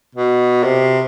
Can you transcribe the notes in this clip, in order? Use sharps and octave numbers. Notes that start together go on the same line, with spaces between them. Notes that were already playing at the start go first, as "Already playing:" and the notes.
B2
C3